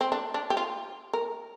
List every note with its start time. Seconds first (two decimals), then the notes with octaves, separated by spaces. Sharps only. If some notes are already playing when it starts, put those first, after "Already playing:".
0.01 C4
0.12 D4
0.34 D4
0.50 G4
0.57 F4
1.13 A#4